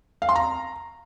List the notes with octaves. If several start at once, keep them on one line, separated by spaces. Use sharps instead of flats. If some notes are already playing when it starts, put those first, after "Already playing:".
F5
C6
A#5